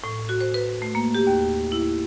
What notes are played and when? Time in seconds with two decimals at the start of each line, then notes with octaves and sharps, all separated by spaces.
0.04 A2
0.29 F#4
0.41 C5
0.54 B4
0.82 A3
0.95 A#3
1.15 G4
1.27 D#2
1.72 E4